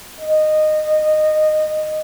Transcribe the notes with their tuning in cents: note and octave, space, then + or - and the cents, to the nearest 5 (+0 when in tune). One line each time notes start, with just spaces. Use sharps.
D#5 -15